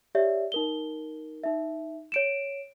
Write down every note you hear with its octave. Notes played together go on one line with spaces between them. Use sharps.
G4 C#5 D5 E5
D#4 A#4 G7
D#4 E5
C#5 D7 E7